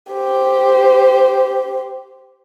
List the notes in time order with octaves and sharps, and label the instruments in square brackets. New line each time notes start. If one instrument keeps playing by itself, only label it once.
[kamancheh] G4 C5